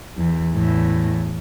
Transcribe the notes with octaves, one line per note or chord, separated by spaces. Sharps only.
E2
E2 A2